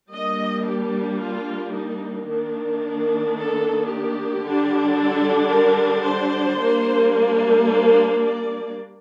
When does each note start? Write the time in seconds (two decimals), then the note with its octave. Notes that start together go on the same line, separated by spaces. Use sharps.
0.14 G3 A#3 D4 D#5
0.67 G4
1.22 F4
1.75 D#4
2.28 D#3 A#3 D4
3.37 A4
3.90 G4
4.44 D3 G3 D4
4.98 A4
5.51 A#4
6.05 C5
6.59 G3 A#3 D4
7.67 C5
8.21 D5